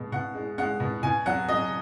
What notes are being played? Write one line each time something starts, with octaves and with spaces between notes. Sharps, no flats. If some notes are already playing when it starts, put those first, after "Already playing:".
Already playing: B2 G#3
B2 F#5
G#3
G#3 F#5
B2
B2 G#5
F#3 F#5
F#3 D#5